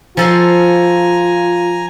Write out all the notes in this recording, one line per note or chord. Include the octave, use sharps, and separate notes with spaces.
F3 F4 A4 G#5 A#5 C6